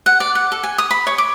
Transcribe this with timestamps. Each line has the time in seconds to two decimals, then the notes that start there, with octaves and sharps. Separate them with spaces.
0.06 F#5
0.20 D5
0.35 F#5
0.52 A4
0.63 G#5
0.78 D#6
0.91 B5
1.07 C#5
1.18 D6